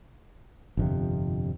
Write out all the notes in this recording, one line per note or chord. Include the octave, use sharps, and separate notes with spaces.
G1 F2 C3